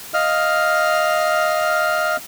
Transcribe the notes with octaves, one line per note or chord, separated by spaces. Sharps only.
D#5 F5 F6